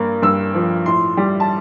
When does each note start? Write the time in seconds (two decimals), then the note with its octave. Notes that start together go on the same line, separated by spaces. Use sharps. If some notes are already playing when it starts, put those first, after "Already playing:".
Already playing: G2 A#3
0.22 G2 E6
0.54 F3
0.85 A2 C6
1.17 G3
1.40 A5